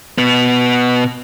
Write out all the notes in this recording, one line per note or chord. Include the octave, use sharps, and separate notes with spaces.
B2 B3